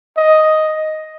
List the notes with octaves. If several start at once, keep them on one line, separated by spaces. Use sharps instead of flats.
D#5